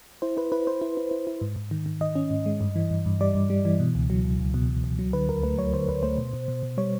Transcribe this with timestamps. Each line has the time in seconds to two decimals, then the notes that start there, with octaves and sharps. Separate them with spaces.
0.22 E4 C5
0.37 E4 B4
0.52 E4 B4
0.67 E4 C5
0.81 E4
0.97 E4
1.11 E4
1.27 E4
1.41 G#2
1.56 G#2
1.71 D#3
1.86 D#3
2.01 D#3 D#5
2.16 C#4
2.31 G#2
2.46 G#3
2.61 G2
2.76 E3
2.91 G2
3.06 G2
3.21 G3 D5
3.35 G2
3.50 G3
3.65 E3
3.80 B2
3.95 C#2
4.10 F#3
4.25 C#2
4.39 C#2
4.54 B2
4.69 B2
4.84 C#2
4.99 F#3
5.13 D3 B4
5.29 D2 A#4
5.43 A3 B4
5.58 F#3 C#5
5.73 D3 C5
5.88 D2 B4
6.03 A3 C5
6.18 B2
6.33 B2
6.48 B2
6.63 B2
6.78 G3 C#5